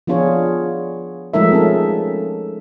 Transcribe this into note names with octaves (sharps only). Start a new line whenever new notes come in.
F3 B3 D4 F4 G#4 C#5
F3 G#3 A3 D#4 A#4 E5
C4 C#4 A4